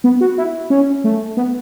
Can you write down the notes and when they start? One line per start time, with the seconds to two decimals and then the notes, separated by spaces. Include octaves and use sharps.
0.04 B3
0.21 F#4
0.38 E4
0.70 C#4
1.04 A3
1.37 B3